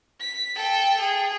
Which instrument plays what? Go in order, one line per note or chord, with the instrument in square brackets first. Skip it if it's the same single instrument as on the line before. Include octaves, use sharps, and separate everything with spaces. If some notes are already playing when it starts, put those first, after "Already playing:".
[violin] B6
A4 G5
G#4